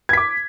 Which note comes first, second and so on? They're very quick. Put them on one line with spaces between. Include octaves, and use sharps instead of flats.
G#6 B6 D6